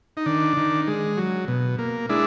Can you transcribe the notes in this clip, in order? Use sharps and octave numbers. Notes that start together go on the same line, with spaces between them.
D#4
D#3 D4
D#3
G#3
F#3
B2
A#3
G#3 D4 E4